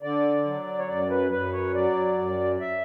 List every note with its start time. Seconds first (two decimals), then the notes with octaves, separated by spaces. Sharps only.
0.03 D3 D5
0.45 F#3
0.79 C#5
0.88 F#2 D5
1.10 B4
1.31 F#2 B4
1.53 C#5
1.74 F#3 D5
2.17 F#2
2.61 E5